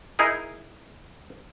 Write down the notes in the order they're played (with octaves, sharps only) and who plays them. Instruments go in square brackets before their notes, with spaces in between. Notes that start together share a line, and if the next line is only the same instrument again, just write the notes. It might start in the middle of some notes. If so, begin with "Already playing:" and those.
[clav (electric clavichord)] D#4 E4 G#4 A#4 D#5